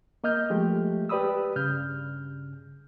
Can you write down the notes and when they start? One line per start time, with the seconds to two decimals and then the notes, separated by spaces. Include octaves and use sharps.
0.24 A#3 D#5 F6 G6
0.50 F3 G#3 A3 G4
1.09 G4 B4 D5 B5 D#6 E6
1.56 G2 C#3 F6 G6